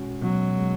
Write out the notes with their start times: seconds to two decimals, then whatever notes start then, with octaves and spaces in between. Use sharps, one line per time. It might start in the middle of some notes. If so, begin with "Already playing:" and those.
Already playing: B2 G#3 C#4 F#4
0.22 B2 F#3
0.59 G#3